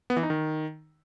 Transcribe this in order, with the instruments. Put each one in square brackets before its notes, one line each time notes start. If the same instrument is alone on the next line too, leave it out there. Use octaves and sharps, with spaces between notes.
[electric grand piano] B3
E3
D#4
D#3